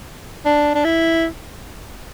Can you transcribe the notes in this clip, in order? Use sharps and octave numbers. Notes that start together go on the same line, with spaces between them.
D4
D4
E4